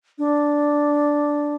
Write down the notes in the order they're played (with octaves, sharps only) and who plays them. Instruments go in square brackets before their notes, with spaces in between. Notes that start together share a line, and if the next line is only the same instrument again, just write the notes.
[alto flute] D4